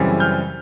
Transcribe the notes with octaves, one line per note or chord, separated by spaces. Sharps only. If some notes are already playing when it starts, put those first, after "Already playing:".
Already playing: F#2 C#3 E3 G3 C4
F6 G6